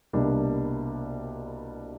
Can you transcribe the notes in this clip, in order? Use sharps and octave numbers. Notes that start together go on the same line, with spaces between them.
C2 B2 G3 A#3 D4